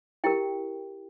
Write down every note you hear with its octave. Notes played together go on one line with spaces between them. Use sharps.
E4 G4 A#4 G5